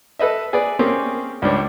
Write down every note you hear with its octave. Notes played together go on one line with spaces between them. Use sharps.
A4 B4 D#5 E5
G#4 B4 D5
A#3 C4 C#4 G4 G#4
C#2 G3 D4 C#5